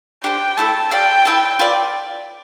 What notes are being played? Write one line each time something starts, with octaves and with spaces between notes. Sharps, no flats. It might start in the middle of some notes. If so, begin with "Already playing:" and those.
D4 G4 C5 G5
A3 E4 A4 A5
G4 D5 F5 G5 A5
E4 B4 E5 A5
F4 B4 D5